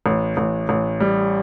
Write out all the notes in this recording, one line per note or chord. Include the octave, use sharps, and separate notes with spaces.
A1
A1
A1
G3